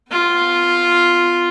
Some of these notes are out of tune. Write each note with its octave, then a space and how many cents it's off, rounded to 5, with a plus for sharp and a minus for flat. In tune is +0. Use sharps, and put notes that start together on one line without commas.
B3 +30 F4 +0